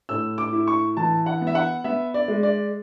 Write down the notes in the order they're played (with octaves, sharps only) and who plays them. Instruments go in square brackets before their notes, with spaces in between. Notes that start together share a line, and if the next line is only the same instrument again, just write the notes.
[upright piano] A2 E6
D6
E4
C#6
E3 A5
F#5
B3
E5
F#5
B3 E5
D5
G#3
D5